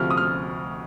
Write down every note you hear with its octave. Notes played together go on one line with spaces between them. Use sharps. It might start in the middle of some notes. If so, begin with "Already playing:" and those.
Already playing: D2 C3 F3 F6
D#6
F6